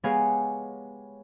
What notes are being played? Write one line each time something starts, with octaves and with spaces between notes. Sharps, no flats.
G#3 B3 G4 G#4 C#5 F5